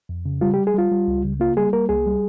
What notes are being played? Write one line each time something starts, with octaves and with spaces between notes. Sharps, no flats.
F2
C#3
G3 F4
G4
G3
G#4
G3 F4
G3
C#2
C#3
A#3 F4
G3 G#4
A#3 A#4
C2 G#4
G3